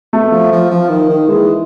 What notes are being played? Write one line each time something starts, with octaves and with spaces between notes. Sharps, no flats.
B2 A3
F3
F3
F3
D#3
D#3
E3 G#3